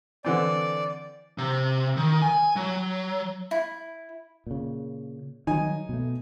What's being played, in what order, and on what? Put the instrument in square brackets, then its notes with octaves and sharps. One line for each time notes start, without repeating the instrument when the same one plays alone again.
[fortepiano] D3 E3 C4 [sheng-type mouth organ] D5
[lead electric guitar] C3
D#3
G#5
F#3
[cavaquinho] E4
[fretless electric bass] A#2 C#3
[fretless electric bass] D#3 F#3 [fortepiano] D#4 G#5
[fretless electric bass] B2 A3